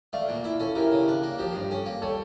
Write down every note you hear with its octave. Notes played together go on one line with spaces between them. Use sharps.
A3 D5 F5
A#2
E4
C#4 A4
E3 G4 A#4
C#3
D4
A#3
F3 G4
G2
C#4 A4
A#3
G3 A4 C#5